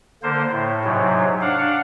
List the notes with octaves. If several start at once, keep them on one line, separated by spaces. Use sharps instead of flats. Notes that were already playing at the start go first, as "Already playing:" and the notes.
D3 A#3 C5
A2
G#2 C3 F#3
D4 F5 F#5